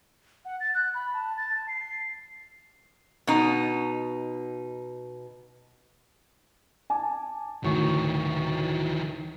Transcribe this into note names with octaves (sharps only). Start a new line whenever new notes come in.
F#5
A6
F#6
B5
A5
A6
A5
C7
B2 D#4
G#5 A5 D6
A1 D2 D#3 E3 C#6